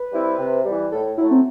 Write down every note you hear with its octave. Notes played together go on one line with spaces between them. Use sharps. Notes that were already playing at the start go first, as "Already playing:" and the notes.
Already playing: B4
G3 C4 E4
C3
G3
E3
A2 A4
F#3 A3 E4
C4